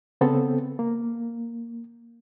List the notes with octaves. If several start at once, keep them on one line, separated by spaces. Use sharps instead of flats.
C#3 B3 C4 A4
A#3